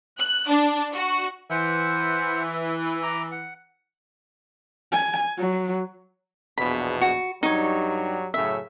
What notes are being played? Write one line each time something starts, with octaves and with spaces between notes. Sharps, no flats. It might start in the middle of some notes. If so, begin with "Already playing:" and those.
F#6
D4
F#4
E3 C5 F#5
B4
A#5 D6
F#5
G#5
F#3
A#1 E2 B2 B5
F#4
G2 F#3 G3 D#4 C#5
F#2 A2 C#3 E5